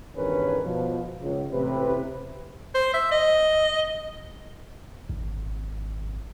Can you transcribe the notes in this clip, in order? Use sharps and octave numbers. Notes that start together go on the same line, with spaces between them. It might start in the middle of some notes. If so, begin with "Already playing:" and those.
E2 G2 D#3 C#4 A#4 B4
B2 F3
C#2
A1 C3 B4
C5
E5
D#5
G#1